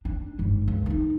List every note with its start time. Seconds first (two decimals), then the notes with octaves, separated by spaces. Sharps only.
0.05 D4
0.39 G1 G#2
0.68 C#2
0.86 D4 D#4